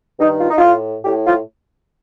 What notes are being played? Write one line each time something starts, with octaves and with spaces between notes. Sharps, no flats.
G2 D#3 D#4
F4
D#4
A2 F4
A2 G4
F4